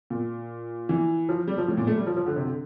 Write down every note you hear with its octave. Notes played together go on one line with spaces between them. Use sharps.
A#2
E3
F3
G3
F3
A2
A#2
A3
G3
F3
F3
D3
C3
D3